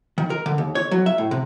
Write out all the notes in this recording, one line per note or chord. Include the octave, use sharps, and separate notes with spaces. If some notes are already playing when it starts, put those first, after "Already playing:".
D#3
A#4
D3
D#2
C#5
F#3
E5
A2
C3